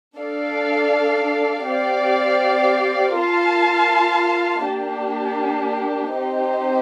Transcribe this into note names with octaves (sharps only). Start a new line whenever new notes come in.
D4 A4 D5 F5
C4 G4 D5 F5
F4 A#4 F5 A5
A#3 D4 G4
C4 D#4 G4 C5